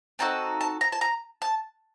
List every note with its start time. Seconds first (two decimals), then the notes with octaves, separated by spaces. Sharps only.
0.19 C4 D#4 F#4 A4 A5
0.61 A5
0.81 A#5
0.92 A5
1.01 A#5
1.42 A5